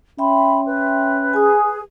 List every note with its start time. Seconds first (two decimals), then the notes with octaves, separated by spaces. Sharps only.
0.19 C#4 E5 G5 B5 C6
0.65 B4
1.34 G#4 G#5 D#6